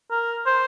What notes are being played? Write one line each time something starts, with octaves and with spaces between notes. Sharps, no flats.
A#4
C5